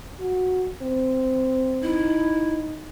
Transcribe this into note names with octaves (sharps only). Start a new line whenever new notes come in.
F#4
C4
D#4 E4